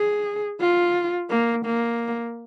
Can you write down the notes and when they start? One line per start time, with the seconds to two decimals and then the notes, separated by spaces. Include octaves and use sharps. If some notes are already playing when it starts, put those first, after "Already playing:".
Already playing: G#4
0.60 F4
1.30 A#3
1.65 A#3